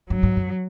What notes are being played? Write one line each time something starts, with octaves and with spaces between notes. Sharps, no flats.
G2 F#3
G#2
F#2